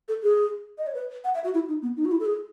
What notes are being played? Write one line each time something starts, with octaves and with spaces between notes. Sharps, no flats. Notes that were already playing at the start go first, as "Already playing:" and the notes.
A4
G#4
D#5
C#5
B4
F#5
E5
F#4
E4
D#4
B3
D#4
F#4
E4
A4
G#4